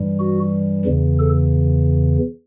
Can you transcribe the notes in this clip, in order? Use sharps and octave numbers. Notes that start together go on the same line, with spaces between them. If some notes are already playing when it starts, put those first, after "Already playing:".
Already playing: G2 E3 G3
F#4
E2 C#3 E3
A4